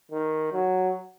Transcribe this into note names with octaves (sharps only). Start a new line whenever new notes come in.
D#3
F#3